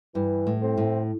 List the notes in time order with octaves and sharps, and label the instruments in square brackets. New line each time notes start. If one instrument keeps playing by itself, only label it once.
[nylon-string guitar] G2 [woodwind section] E3
[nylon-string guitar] A2
[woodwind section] A3 C4
[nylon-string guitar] A2